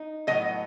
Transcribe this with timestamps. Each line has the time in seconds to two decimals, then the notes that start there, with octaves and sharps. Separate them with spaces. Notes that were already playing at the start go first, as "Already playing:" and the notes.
Already playing: D#4
0.27 A2 F#3 B3 D#5